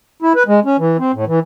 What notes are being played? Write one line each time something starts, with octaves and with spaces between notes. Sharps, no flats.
E4
B4
G#3
C#4
E3
C4
A2
E3